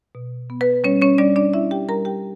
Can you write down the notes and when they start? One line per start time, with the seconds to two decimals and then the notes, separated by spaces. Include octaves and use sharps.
0.15 B2
0.50 B3
0.61 B4
0.84 G3 C#4 C#5
1.02 C#4 C#5
1.18 G3 D4 D5
1.36 D4 D5
1.53 C#4 E4 E5
1.71 G4 G5
1.88 G3 A#4 A#5
2.05 G4 G5